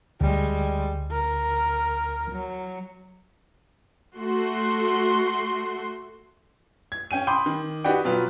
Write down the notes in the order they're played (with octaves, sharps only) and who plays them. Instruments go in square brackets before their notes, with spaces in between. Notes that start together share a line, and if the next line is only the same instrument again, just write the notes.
[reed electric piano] D2 [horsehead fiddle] G3 G#3
[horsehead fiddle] A#4
F#3
[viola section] A3 F#4 C6
[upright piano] G#6
C#4 G5 G#5 D#7
G5 B5 C6 D6 D#6 G6
D#3
D#4 F#4 G4 B4 D5 G5
B2 F#3 F4 B4